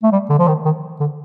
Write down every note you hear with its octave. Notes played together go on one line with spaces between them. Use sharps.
A3
G3
D3
F3
D#3
D#3
D3